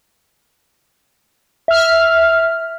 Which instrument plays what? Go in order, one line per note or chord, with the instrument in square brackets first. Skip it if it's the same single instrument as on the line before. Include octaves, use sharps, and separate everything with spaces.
[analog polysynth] E5 F6